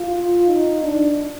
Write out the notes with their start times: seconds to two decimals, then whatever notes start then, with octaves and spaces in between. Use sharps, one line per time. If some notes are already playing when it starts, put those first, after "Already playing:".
Already playing: F4
0.47 D#4
0.84 D4